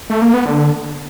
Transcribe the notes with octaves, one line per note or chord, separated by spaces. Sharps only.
A3
A#3
B3
D3